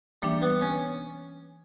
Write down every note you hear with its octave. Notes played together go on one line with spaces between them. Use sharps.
E3 G3 A#3 D4
B3
C#4